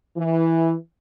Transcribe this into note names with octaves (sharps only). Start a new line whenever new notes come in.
E3